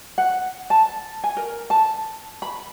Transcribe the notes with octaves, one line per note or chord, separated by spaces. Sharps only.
F#5
A5
G#5
A#4
A5
B5